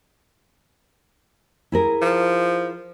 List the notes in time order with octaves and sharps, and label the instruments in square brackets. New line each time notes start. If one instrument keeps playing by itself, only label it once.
[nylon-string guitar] E4 G#4 A#4
[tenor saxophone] F3